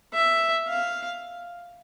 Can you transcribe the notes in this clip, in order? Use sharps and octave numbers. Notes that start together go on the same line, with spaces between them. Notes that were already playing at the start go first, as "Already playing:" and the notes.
E5
F5